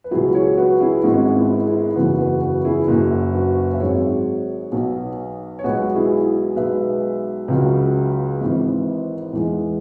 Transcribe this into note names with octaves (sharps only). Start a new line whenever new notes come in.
B4
C#2 B2 F#3 E4 G#4
G#4 C#5
F#4 B4
E4 G#4
G#1 G#2 G#3 C#4 F#4
B3 E4
E4 G#4
F#1 E2 C#3 E3 F#4 B4
F#4 B4
F#4 B4
E4 G#4
F#1 F#2 F#3
F#4 B4
E5
G#1 G#2 F#3 G#4 C#5
B1 B2 F#3
C#5
B1 B2 G#3 F#4 B4
E4 G#4
B1 B2 G#3 B4 E5
C#2 C#3 F#3
G#1 G#2 E3
E2 E3 G#3